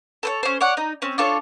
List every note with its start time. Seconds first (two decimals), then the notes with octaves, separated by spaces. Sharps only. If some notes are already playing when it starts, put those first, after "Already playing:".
0.23 A4 C5 C#5
0.43 C#4 C5
0.61 C#5 D5 F#5
0.77 D#4
1.02 C4 C#4
1.18 D4 F4 A4 C#5